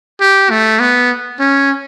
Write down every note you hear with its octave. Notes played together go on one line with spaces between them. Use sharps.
G4
A3
B3
C#4